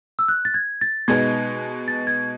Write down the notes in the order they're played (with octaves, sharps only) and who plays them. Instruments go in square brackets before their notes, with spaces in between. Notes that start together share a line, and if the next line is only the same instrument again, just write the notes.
[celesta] E6
F#6
A6
G#6
A6
[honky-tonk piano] B2 G#3 B3 D#4 [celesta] G#6
[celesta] A6
G#6